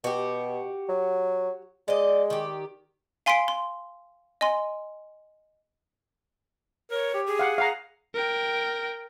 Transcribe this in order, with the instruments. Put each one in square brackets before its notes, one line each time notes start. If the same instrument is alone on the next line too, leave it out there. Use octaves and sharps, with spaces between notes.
[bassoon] B2 [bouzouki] F#4 G4
[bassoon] F#3
[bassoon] G#3 [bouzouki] D5 D#5
[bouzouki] D#3 G4
[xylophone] F5 G#5 C6 B6 C7 D7
C6
D#5 G#5 C6
[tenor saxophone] A#4 [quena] C#5
[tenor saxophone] G4
[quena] G#4
[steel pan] F5 F#5
F5 F#5 A#5
[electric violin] A#4 G5